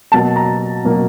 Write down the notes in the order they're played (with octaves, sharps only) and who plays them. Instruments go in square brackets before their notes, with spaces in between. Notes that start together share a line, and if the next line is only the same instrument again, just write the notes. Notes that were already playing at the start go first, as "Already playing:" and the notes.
[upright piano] B2 F#3 A#3 A5
A#5
B2 F#3 A#3